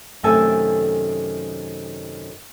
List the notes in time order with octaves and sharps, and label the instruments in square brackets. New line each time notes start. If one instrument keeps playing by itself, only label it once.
[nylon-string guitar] F#2 C3 D#3 A3 A4 G#5